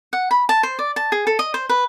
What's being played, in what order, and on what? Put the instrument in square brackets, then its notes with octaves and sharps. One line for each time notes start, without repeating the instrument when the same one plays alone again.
[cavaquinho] F#5
B5
A5
C5
D5
A5
G#4
A4
D#5
C5
B4